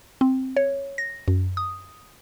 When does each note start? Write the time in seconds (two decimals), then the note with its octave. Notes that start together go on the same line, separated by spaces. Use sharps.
0.21 C4
0.56 C#5
0.98 A#6
1.28 F#2
1.57 D#6